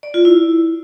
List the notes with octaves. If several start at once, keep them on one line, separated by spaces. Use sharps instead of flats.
D5
F4
E4